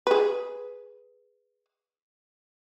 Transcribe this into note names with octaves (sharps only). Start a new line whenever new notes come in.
G#4 B4